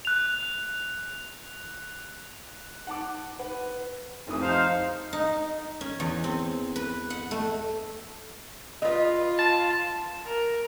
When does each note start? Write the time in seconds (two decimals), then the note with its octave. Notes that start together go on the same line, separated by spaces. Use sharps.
0.05 F#6 F7
2.87 F#5 A5 D6
3.39 B4 F#5
4.27 F1 F2 E3 D#6
4.41 D#4 C5 F5
5.13 D#4
5.81 C#4
6.00 E2
6.24 C4
6.76 B4
7.10 F#5
7.31 A3
8.82 F4 B4 D#5
9.39 A5
10.26 A#4